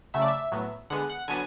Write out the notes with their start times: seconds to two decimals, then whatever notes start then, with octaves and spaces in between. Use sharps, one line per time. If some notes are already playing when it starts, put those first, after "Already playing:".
0.14 C#3 F#3 A3 E5
0.22 D5
0.28 E5
0.52 A2 F#3 B3
0.90 D3 G#3 B3 F#5
1.10 F#5
1.28 D3 F#3 B3 G#5